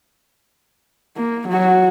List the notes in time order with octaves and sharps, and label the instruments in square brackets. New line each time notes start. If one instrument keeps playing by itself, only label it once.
[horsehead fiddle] A#3
F#3 F#4